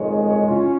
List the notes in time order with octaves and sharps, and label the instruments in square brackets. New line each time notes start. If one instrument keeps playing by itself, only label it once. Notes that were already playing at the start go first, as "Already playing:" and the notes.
Already playing: [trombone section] F2 D#3 G#3 C4 [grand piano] C#5
[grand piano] C#5
C#5
[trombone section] C#4 [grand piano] F4